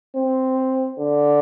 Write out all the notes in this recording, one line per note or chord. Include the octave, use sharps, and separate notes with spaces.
C4
D3